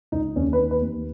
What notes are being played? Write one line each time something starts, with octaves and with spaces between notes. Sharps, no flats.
C#2 D#4
D#2 C#4
B4
D#2
B4
D#2